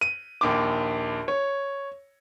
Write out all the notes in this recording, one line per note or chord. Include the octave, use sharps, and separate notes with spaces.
D#7
A#1 D#2 D6
C#5